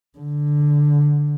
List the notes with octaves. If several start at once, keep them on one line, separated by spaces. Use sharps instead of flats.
D3